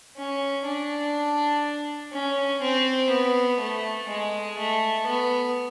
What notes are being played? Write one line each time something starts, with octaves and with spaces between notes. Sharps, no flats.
C#4
D4
C#4
C4
B3
A3
G#3
A3
B3